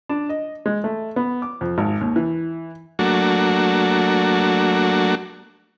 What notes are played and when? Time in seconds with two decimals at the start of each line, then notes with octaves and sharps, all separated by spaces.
0.09 D4
0.29 D#5
0.66 G#3
0.84 A3
1.16 B3
1.42 D6
1.61 F2
1.78 G#1
2.01 D#2
2.16 E3
2.99 F#3 A3 A#3 D4 F#4